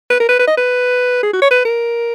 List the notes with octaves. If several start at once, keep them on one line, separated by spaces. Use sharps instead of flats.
B4
A#4
B4
B4
D#5
B4
G#4
F#4
C#5
B4
A#4